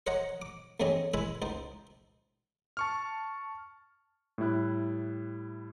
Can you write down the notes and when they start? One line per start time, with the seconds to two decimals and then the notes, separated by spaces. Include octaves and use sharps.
0.07 C5 C#5 D#5 F5 F#5 A#5
0.42 D6
0.80 E2 A2 C4 C#4 G#4 D#5
1.14 G#3 E4 B4 E5 G#5 C6
1.42 C#2 D#4 C5
2.77 A5 C#6 F6
4.38 A2 G3 E4 F#6